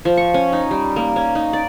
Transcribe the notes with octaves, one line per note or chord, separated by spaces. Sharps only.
F3
C#6
C#4
D#4
G3
A#3
C#4
D#4
D5